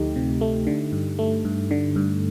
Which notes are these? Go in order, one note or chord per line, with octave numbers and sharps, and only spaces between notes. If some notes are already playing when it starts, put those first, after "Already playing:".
Already playing: D2 F3 A3 D#4 G4
C3
A3
D3
G2
A3
G2
D3
G2